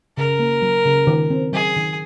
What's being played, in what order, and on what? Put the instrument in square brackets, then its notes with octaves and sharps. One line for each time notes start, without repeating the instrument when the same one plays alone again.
[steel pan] C#3 [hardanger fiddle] A#4
[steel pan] A#3
F#3
C#3
D#3
C4
[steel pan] F#3 [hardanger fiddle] G#4
[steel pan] D#3